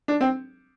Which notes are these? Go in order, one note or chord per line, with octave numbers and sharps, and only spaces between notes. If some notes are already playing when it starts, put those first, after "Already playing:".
D4
C4